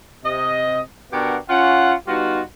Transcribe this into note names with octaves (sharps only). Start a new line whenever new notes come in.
C3 D#5
B2 B3 D4 G4 A#4 F#5
C#4 F4 F#5
G3 B3 D#4 F4 F#4